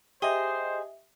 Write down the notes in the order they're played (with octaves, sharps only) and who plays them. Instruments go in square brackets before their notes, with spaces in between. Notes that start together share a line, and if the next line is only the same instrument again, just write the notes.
[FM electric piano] G4 D#5 [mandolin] G#4 [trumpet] C5 [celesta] E5 G7